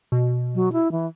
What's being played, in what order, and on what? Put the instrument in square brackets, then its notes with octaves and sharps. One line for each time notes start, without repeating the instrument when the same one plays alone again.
[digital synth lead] B2
[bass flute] F#3
E4
E3